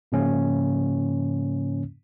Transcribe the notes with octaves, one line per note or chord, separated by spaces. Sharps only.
G#2 C#3 F3 A#3 C#4